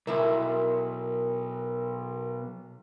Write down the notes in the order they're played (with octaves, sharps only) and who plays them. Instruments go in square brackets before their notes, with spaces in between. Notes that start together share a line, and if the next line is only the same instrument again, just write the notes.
[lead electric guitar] B1 [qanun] E4 E5 [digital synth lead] A#4